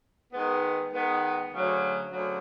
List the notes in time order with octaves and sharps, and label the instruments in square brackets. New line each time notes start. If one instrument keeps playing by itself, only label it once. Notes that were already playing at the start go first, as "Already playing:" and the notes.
[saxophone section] D#3 G#3 B3
D#3 G#3 B3
D2 C#3 F#3
D2 C#3 F#3